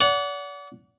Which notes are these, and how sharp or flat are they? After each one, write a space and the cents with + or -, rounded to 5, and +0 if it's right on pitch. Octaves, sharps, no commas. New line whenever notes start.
D5 -40 F#5 +0